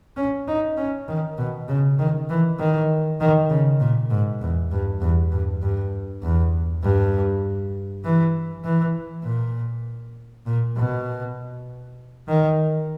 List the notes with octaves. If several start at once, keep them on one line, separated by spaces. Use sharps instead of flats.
C#4
D#4
C#4
D#3
B2
C#3
D#3
E3
D#3
D#3
C#3
A#2
G#2
E2
G2
E2
G2
G2
E2
G2
E3
E3
A#2
A#2
B2
D#3